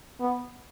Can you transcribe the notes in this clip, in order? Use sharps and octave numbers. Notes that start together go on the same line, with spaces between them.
B3